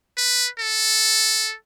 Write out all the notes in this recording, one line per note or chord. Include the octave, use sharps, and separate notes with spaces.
B4
A4